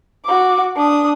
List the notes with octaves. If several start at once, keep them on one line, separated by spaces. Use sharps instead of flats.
F#4 D6
D4 D#6